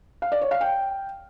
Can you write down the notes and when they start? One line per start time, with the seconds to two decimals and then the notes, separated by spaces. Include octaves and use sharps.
0.22 F5
0.32 D5
0.41 C#5
0.51 F5
0.61 G5